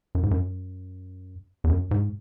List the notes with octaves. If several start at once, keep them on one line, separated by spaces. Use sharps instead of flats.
F#2
G#2
F#2
E2
F#2
G#2